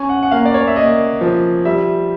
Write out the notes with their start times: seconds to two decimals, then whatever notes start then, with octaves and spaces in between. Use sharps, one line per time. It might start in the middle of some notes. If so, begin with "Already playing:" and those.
Already playing: C#4 G#5
0.09 F#5
0.23 F#5
0.31 A#3 F5
0.46 D5
0.54 C#5
0.67 E5
0.76 A#3 D#5
1.21 F3
1.65 G3 E5